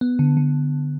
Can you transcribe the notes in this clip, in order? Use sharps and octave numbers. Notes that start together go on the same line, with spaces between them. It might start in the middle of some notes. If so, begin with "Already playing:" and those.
B3
D3
D3